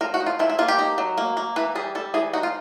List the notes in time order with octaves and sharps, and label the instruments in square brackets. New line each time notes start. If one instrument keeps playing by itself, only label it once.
[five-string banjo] F3 A#4
F#4
D#4
F4
F3 E4
E4
A#3 F4
G4
D#4
F#3
A#3
A#3
E3 B4
G3 G#4
G3 A4
E3 G#4
D#4 F#4
F4